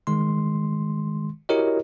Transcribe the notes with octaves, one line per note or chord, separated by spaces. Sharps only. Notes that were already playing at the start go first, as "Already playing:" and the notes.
D#3 G#3 C6
E4 F#4 G4 A#4 C#5 D#5